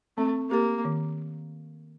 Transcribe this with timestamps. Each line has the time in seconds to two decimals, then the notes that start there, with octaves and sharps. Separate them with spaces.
0.18 A3 C4
0.50 A#3 G4 A#4
0.85 D#3